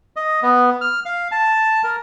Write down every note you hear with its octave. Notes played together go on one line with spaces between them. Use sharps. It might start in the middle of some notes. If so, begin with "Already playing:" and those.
D#5
B3
F6
F5
A5
A#4